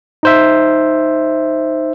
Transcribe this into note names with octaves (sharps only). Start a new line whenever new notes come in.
D#4 C5 E5